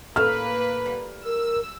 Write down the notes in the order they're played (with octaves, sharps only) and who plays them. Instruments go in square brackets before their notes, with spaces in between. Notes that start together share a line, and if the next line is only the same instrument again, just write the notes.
[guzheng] A2 A3 [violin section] A#3 B4 [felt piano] F6
[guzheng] G3
[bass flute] A#4 [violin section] E6